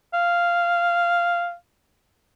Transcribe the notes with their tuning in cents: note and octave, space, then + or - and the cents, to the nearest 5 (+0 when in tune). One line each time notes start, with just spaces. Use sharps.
F5 -10